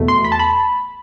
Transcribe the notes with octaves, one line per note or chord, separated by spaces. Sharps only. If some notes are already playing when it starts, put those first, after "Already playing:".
Already playing: E2 B2 A3
C6
B5
A5
B5